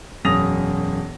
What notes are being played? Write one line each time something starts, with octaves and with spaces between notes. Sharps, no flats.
E1 F#2 D#6 A#6 F7